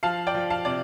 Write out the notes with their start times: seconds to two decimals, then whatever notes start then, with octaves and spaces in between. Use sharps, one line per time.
0.03 F3 F5 A5
0.27 D5 G5
0.35 F3
0.50 F5 A5
0.65 C3 D5